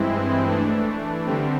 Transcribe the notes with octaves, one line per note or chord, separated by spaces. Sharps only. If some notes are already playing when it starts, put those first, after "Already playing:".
Already playing: G2 E3 G#3 C4 E4
E3 A3 D4
D3 G3 C4